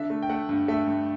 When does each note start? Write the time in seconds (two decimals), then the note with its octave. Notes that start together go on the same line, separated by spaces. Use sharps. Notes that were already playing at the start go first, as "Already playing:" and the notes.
Already playing: D3 E5
0.10 A3
0.23 G5
0.29 A3 F#5
0.49 G2
0.68 A3 E5
0.87 G2